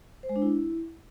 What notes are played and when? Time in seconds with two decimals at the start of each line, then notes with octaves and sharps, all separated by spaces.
0.23 C5
0.29 G#3
0.36 D4
0.42 E4